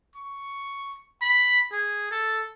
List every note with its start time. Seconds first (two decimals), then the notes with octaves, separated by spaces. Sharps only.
0.16 C#6
1.22 B5
1.72 G#4
2.11 A4